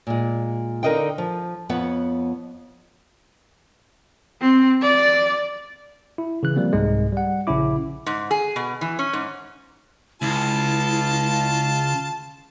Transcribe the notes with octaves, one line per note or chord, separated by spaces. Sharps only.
A#2 G#3
D3 D#4 A#4 D#5 F5 G5
F3
F2 F3 B3 C#5 F#5
C4
D5
E4
C#3 E3 F#6
F3 G3 A#3 C4
C2 G#2 G#3
G3 F#5
A#1 C#3 C#4 E4 D6
G#2
G#4
B2
E3
C#4
G#2
C#2 E4 F4 A5